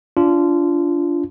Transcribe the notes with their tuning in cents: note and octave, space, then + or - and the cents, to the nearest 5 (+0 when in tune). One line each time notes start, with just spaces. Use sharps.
D4 -20 F4 -20